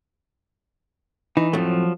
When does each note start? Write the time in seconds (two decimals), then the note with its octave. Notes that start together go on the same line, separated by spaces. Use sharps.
1.37 E3 D#4
1.53 F2 A2 F3 F#3 A3